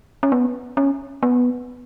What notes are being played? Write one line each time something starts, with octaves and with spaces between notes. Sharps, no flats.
C#4
B3
C#4
B3